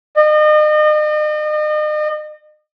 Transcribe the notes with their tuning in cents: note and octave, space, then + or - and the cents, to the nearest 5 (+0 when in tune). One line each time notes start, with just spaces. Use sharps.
D#5 -40